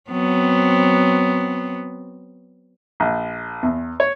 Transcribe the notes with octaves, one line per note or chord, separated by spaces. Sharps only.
F#3 B3 C4
A#1
E2
C#5